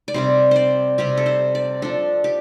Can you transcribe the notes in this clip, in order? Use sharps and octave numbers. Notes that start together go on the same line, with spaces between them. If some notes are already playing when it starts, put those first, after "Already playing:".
D5
C3 G3 C4 C5
C5 D5
C3 G3 C4 G4
A4
C5
D5
F3 D4 A4
G4